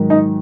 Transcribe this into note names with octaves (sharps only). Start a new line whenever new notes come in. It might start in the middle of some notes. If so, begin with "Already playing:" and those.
Already playing: G#2 D#3 F#3
D#4